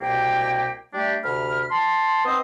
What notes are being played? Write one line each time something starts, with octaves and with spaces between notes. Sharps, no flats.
C2 B2 A#3 G4 G5
G3 A3 D4 G4
D2 C3 B5 F6
A5 C6
B3 C4 C5 D#5 D#6